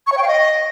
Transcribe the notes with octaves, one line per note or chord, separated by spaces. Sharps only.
C#6
C#5
G5
F5
D#5